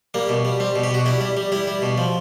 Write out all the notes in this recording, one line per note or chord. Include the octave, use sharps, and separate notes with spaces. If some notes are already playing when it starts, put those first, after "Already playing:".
G3 A#3
B2
G3
G3 C4
B2
G4
B2 F#4
G3 E4
G3
G3
G3 E4
G3
B2
F3